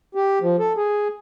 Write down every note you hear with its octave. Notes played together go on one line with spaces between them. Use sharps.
G4
F3
A4
G#4